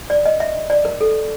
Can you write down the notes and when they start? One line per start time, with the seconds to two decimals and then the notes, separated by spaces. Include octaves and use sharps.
0.10 D5
0.26 D#5
0.40 E5
0.70 D5
0.85 A#4
1.01 A4